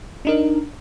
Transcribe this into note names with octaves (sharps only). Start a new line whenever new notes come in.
D4 D#4 A#4